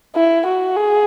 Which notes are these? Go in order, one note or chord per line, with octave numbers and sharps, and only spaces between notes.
E4
F#4
G#4